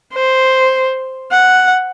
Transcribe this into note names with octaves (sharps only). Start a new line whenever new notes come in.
C5
F#5